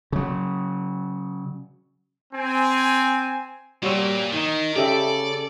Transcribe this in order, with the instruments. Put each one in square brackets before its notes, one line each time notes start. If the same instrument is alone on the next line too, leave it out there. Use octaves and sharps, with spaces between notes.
[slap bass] C#3 F#3
[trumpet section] C4 G#5
[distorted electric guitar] A#2 [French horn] G3 [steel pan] F#4 C#5 E6
[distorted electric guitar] D#3 [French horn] D#4
[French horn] C#3 [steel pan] G4 E5 [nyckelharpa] A4 [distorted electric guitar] D5